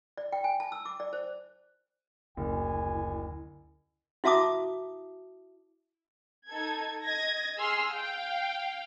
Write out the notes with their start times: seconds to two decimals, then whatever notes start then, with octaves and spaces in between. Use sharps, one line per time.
0.17 D5
0.32 G5
0.44 G#5
0.60 A5
0.72 E6
0.85 D6
1.00 D5
1.13 C5
2.37 F#1 D2 E4 G#5
4.24 E4 F#4 E5 A5 D6 D#6
6.47 D#4 A4 G#6
7.03 D#5 G#6 A#6
7.59 G#4 C6 E6 F6
7.92 F5 G5